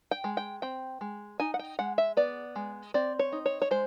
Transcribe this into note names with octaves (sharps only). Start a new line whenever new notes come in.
G5
G#3
G5
C4 G5
G#3
D#4 G#5
F#5
G5
G#3 F#5
E5
B3 D5
G#3
C4 D5
C#5
D#4
C#5
C#5
G#3 C5